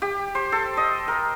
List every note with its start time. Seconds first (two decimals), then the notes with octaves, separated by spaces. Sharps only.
0.02 G4
0.35 C5
0.52 A4
0.77 D#5
1.08 A#4